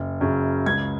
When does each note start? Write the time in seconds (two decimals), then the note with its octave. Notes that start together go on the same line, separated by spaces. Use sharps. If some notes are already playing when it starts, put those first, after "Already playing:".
Already playing: F#1
0.21 F#2 C#3
0.66 C#2 G#6